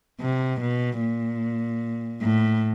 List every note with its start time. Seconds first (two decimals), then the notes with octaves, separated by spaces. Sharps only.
0.21 C3
0.61 B2
1.01 A#2
2.22 A2